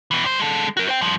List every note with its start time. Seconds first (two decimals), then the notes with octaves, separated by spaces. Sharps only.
0.11 B2 E3
0.24 G2 C5
0.39 G#3 A4
0.77 F#4 A#4
0.89 C5 G5
1.01 G2 F3